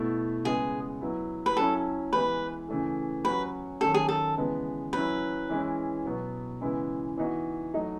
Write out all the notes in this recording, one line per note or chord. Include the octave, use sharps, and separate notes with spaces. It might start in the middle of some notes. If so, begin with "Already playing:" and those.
Already playing: B2 A3 E4
C#3 G#3 B3 G#4
F#3 B3 E4
B4
F#3 C#4 E4 A4
E3 G#3 B3 B4
C#3 E3 A3
F#3 C#4 F#4 B4
D#3 F#3 C#4 A4
G#4
A4
C#3 E3 G#3 B3
F#3 C#4 E4 B4
E3 G#3 C#4 E4
B2 F#3 B3
C#3 E3 G#3 B3 E4
E3 B3 D#4 F#4
F#3 A3 D#4